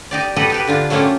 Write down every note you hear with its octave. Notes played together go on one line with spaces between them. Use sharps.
D#4 G4 D5
F#4 G4 A4 B4 D#5 F#5
D#4 G4 B4
D3 D4 F4
F#3 A3 A#3 C#4 F4 G4